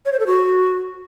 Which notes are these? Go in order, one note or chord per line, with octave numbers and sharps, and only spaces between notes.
C#5
C5
A4
F#4